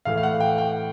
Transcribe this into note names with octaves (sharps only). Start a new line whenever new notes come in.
A2 E3 A3 F5
F5
F#5
G5
G5